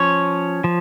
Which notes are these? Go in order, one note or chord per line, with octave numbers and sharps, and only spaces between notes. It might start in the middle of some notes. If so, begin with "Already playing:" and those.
Already playing: F3 C#4 C#5
F3